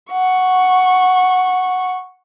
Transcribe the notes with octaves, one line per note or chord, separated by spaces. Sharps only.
F#5 C#6